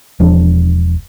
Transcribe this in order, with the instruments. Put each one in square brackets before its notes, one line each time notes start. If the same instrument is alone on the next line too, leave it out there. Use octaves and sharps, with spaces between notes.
[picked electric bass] E1 F3 D4